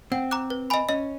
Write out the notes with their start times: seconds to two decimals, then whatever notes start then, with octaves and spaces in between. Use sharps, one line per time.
0.12 C4 F#5
0.31 A#5 D6 F#6
0.50 B4
0.70 D#5 G#5 B5
0.89 C#4 D#5